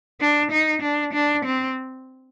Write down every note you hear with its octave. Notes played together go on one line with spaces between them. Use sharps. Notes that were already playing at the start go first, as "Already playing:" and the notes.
D4
D#4
D4
D4
C4